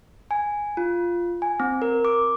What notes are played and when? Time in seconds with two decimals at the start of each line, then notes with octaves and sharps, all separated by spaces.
0.31 G#5
0.77 F4
1.42 G#5
1.60 C4
1.82 A#4
2.05 D6